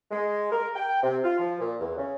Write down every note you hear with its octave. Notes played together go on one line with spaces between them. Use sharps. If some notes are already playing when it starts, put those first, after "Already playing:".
G#3
A#4
G5
C3
F4
F3
A#2
E2
C#3